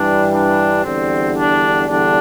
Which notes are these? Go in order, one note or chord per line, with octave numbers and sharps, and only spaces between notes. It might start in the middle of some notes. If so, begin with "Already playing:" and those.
Already playing: G2 E3 G3 D4
D4
E2 D3 G3 C4
D4
E2 D3 G3 D4